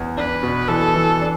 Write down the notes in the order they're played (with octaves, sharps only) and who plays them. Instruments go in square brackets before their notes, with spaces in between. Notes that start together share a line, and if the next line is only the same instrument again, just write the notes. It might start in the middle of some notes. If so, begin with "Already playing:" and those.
Already playing: [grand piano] E2
[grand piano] D4 [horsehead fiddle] B4
[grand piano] B2
[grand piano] E3 [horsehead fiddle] A4
[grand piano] E3
D4